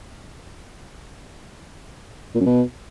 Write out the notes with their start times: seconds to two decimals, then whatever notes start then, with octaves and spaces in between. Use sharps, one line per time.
2.35 A#2
2.41 F#2
2.46 B2